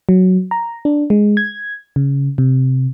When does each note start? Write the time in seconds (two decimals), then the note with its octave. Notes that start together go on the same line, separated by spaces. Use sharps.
0.09 F#3
0.51 A#5
0.85 D4
1.10 G#3
1.37 G#6
1.96 C#3
2.38 C3